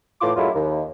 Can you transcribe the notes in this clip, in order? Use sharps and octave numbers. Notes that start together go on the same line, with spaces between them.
A2 E3 F4 C6 D6
F#2 F#3 G#3 A3 E4 F4
D#2